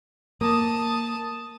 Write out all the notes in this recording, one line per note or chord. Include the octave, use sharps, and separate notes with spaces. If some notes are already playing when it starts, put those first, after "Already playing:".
A#3 A5 D#6